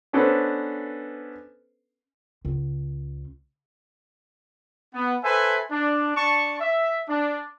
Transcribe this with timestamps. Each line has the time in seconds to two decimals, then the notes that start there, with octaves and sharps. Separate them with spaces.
0.13 B3 C#4 D4 A4 B4 C5
2.45 C#2 C#3
4.94 B3
5.24 A4 B4 C5 E5 G#5
5.71 D4
6.16 D4 A5 C#6
6.60 E5
7.08 D4